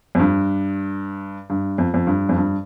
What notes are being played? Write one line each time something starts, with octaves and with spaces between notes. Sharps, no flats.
F2
G2
G2
F2
F2
G2
F2
G2